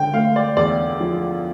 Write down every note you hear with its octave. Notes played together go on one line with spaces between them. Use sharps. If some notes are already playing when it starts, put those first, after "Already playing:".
Already playing: D3 G5
A3 F5
D5
E2 D5
F3